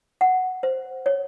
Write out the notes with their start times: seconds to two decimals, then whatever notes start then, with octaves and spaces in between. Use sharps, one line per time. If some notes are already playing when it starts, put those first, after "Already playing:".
0.21 F#5
0.63 C5
1.06 C#5